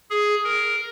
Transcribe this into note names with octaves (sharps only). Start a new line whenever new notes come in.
G#4
A#4